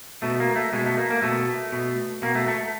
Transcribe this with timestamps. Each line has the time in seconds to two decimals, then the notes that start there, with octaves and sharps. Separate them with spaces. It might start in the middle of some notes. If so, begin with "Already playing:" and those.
0.22 B2 A3
0.40 A#3
0.56 A3
0.73 B2 G#3
0.86 A3
0.98 A#3
1.10 A#3
1.22 B2 A3
1.72 B2
2.22 B2 A#3
2.35 A3
2.48 A3